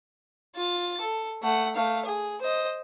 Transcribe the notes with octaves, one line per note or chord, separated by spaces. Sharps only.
F4 A6
A4
A3 F#5
A3 F5
G#4
C5 D#5